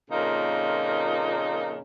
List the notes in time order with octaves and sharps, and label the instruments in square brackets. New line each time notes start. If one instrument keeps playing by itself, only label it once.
[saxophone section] F2 A#2 C#3 A#3 D#4